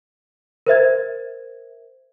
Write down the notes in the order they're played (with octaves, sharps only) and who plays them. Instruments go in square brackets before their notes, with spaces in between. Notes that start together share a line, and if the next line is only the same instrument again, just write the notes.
[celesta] A#4 C5 E5 G#6